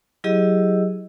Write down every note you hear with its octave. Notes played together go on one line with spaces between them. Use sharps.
F#3 E4 G4 G#4 D#5 E6